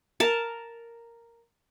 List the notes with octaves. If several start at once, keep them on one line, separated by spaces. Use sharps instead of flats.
A#4 A5